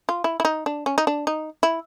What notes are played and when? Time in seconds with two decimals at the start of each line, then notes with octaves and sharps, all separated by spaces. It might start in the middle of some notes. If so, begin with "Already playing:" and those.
0.09 F4
0.24 E4
0.40 E4
0.45 D#4
0.66 D4
0.86 C#4
0.98 D#4
1.07 D4
1.27 D#4
1.63 E4